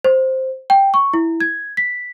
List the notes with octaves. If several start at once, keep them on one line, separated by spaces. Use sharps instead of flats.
C5
G5
C#6
E4
G#6
B6